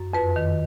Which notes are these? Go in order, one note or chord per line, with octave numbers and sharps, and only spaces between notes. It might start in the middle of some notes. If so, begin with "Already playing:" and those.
Already playing: F#2
F2 B4
D#3